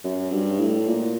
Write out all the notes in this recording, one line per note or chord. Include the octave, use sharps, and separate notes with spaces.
F#2
G2
A2
A#2